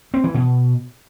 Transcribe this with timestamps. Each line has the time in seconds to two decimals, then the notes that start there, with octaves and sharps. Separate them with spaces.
0.14 C4
0.24 E3
0.34 B2